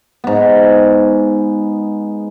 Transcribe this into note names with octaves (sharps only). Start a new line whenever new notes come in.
G#2 B3